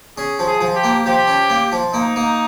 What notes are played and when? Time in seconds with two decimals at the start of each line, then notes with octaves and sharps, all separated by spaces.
0.17 C#4 G#4
0.39 F3
0.47 G#4
0.61 F3
0.76 G4
0.84 A#3
1.05 F3 G4
1.28 C#4
1.50 A#3
1.72 F3
1.93 A#3 D#4
2.16 A#3